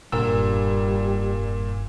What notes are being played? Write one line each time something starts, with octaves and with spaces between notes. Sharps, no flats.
F1 G2 A#2 G3 A#4 E6